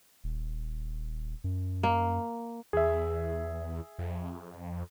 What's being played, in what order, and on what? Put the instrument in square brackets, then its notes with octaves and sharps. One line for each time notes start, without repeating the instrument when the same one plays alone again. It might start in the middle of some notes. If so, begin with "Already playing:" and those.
[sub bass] D#1
F#2
[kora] A#3
[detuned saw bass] E2 [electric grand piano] G#4 E5
[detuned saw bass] F2